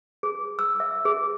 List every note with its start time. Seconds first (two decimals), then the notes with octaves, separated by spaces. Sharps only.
0.23 G#4
0.59 E6
0.80 E5
1.05 G#4